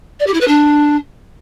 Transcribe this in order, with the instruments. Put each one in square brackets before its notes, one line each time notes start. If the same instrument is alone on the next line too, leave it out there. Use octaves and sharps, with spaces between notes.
[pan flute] D5
G4
E4
B4
D4